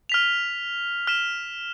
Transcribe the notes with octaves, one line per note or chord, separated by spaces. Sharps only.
F6 B6 F7
F6 B6 E7